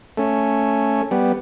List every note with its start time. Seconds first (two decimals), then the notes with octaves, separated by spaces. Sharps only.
0.17 A3 C#4
1.11 G3 B3